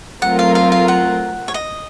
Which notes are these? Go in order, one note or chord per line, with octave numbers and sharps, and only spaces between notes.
F#3 A3 C4 F4 A#4 F#5
F5
F5
F5
F#5
C#5
D#5